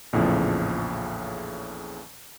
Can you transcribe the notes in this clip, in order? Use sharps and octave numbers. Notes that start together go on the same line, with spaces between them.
A#1 E2 A2 C#3 F3